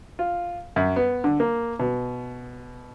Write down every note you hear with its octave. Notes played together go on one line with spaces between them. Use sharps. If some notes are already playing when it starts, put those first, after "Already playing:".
F4
F#2
B3
D3
A#3
B2